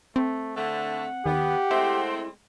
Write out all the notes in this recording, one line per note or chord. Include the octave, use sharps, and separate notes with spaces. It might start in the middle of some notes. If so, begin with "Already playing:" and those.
A3 C4
D3 A3 F#5
D#2 B3 G4
G#3 A3 C4 E4